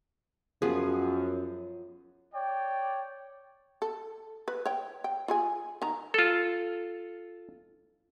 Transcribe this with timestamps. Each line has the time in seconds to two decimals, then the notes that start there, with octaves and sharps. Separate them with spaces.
0.62 F#2 F3 B3 G#4
2.34 C#5 D5 G5
3.82 A4
4.48 B4
4.65 C#5 G5
5.04 G5
5.28 F4 G#4 G#5
5.82 D#3 A#5
6.14 F4 A4